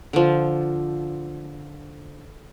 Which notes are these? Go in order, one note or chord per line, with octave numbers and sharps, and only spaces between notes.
D3 F3